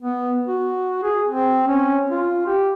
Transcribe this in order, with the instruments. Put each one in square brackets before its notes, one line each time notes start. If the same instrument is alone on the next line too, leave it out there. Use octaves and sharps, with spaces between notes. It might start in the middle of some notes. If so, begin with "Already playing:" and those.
[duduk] B3
F#4
G#4
C4
C#4
F4
G4